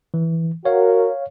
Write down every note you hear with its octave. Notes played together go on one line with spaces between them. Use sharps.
E3
F#4 A#4 C#5 F5